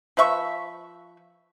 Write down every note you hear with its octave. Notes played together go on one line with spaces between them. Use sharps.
F3 B4 E5 C#6